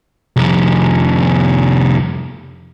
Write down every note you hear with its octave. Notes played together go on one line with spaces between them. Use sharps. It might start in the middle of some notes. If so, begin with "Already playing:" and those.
C2 F2